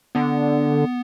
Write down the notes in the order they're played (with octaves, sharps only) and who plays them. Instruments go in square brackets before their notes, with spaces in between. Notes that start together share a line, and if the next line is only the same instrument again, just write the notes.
[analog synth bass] D3 [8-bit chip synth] B3